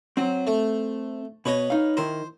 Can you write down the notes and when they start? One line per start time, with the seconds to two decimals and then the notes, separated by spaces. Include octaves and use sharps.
0.17 F#3 C4
0.47 A3
1.46 B2 B4 C#5 D#5
1.70 D#4 F5
1.97 D#3 E4 A#4 C5